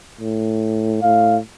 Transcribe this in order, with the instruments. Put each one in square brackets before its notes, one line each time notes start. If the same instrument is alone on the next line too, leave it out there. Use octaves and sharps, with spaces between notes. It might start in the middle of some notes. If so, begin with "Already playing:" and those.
[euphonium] A2
[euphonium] A2 [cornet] F5